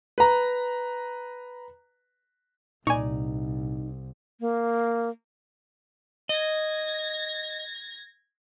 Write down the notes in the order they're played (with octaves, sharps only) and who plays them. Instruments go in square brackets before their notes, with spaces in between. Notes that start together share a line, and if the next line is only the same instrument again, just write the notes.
[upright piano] B4 A#5
[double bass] C2 [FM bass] A#2 [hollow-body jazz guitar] D#4 D5 [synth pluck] G#5 C#6
[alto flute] A#3
[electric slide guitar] D#5 [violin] G#6 A#6